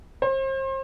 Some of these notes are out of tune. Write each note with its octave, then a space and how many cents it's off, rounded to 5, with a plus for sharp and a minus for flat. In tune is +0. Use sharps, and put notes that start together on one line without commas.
C5 +35